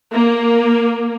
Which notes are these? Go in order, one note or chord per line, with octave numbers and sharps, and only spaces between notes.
A#3